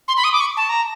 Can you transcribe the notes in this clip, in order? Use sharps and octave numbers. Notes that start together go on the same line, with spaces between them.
C6
B5
D#6
D6
C#6
A5
A#5